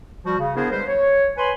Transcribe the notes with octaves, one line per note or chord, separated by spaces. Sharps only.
F3 G3 F#4
C#3
B3 D4 E4 G#4 A#4 C5
G3 G#3 B4 C5
C#5
B4 C#5 G#5 B5 C6